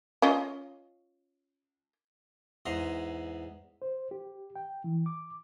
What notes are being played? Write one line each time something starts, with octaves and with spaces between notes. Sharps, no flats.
C#4 F4 D#5
E2 G#2 A#5 C6
C5
G4
G5
E3
D6